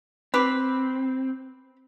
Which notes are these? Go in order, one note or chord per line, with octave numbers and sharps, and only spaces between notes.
C4 G4 B4